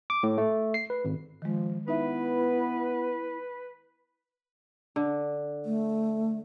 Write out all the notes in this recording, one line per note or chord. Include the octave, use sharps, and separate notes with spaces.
D6
A2
A3
C7
B4
G#1
D#3 F3 G#3
B3 D#4 E4 B4 E5
D3
A3